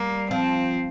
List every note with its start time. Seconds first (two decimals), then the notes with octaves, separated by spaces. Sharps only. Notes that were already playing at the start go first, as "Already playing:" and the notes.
Already playing: G3 A#3
0.31 F3 C4